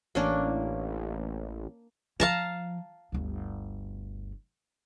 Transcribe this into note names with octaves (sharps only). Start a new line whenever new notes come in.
A1 A#3 C#4 D4
F3 F5 A5 A#5
G1 D2